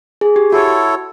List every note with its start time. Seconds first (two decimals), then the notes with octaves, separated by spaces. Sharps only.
0.21 G#4
0.36 G4
0.51 E4 F#4 A4 C#5